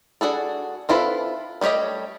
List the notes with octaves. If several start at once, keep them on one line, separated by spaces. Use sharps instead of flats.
D4 F#4 G#4 A4
C4 E4 F4 A4 B4
G3 A3 G4 C#5 D#5